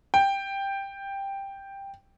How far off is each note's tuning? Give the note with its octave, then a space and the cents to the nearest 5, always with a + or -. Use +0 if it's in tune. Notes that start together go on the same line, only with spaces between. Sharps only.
G5 +5